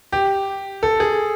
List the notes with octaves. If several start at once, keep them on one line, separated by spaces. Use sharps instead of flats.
G4
A4
G#4